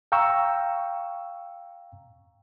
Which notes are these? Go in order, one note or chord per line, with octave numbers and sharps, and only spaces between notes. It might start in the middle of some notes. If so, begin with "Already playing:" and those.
F5 G5 A#5 C#6 E6